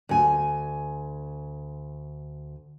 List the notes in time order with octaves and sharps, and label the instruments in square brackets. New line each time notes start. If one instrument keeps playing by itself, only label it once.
[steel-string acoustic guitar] D2 G#5